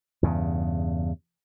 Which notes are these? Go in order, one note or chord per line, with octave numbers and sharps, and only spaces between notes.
E2 G2 C#3